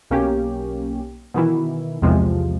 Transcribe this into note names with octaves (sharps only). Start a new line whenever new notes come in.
B1 A#3 C#4 G4
B2 D#3 E3 E4
B1 E2 C3 F3 G#3